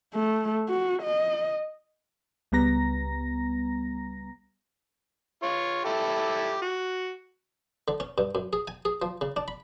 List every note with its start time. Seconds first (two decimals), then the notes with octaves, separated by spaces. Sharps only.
0.14 A3
0.69 F#4
1.02 D#5
2.52 C#2 G3 B3 A#5 A#6
5.43 F4 C#5
5.85 E4 G4 A4
6.62 F#4
7.88 D3
8.00 C#4
8.18 G2
8.35 F#2
8.53 G#4
8.68 G#5
8.85 G#4
9.02 F3
9.21 C#3
9.36 D4
9.48 B5